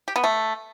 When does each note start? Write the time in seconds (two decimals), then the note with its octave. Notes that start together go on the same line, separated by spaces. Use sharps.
0.08 G4
0.16 B3
0.24 A3